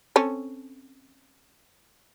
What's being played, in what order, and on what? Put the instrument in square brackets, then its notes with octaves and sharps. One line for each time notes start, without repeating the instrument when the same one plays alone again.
[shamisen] C4 C#4 A4